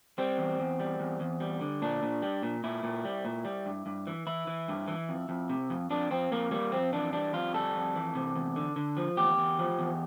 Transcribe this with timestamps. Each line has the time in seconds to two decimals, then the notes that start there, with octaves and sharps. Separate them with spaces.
0.18 G3 C4
0.38 E2
0.59 E2
0.80 G3
1.00 E2
1.20 E2
1.40 G3
1.61 D3
1.82 A#2 D4
2.02 A#2
2.22 G3
2.43 A#2
2.64 A#2 E4
2.83 A#2
3.05 G3
3.25 A#2
3.45 G3
3.66 G2
3.86 G2
4.07 E3
4.27 E3 E4
4.47 E3
4.68 G2
4.88 E3
5.09 F2
5.29 F2
5.49 C3
5.70 F2
5.90 F2 D4
6.11 F2 C4
6.31 F2 A#3
6.51 G3 A#3
6.72 F2 C4
6.93 E3 D4
7.13 G3 D4
7.33 F2 F4
7.54 G3 A4
7.75 F2
7.95 E3
8.15 C3
8.35 E2
8.56 D3
8.76 D3
8.97 F3
9.17 E2 G4
9.37 E2
9.59 F3
9.79 E2